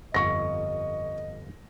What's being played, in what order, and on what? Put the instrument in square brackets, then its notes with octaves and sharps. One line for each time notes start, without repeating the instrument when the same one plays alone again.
[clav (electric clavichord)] G1 F2 [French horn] D#5 [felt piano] C#6 A#6